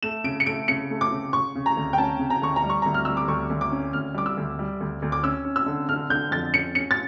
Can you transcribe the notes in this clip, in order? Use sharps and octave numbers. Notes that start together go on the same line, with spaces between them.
A3 E7
C#3 D7
C#7
A3 D7
C#3 C#7
A3
D6
C#3
C#3 C#6
C#3
A#5
D2
G5
C#4 A5
C#3
A#5
D2 C#6
A#5
G3
C#6
D2 A#5
F6
G3 E6
D6
D2 C#6
D2
D6
C#4
D2 F6
G3 D6
E6
D2
G3
D2
D2
D6
C#4 E6
C#4
E6
D3
D3 F6
D3 G6
F2 A6
C#4 C#7
C#4 C#7
A6